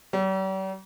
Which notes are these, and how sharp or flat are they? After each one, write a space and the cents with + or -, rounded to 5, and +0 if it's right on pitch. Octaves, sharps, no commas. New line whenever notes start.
G3 -45